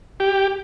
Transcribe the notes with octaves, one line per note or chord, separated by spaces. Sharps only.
G4